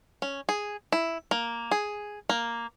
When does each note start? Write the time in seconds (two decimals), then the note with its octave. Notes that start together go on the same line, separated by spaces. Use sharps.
0.22 C#4
0.49 G#4
0.92 E4
1.31 A#3
1.71 G#4
2.29 A#3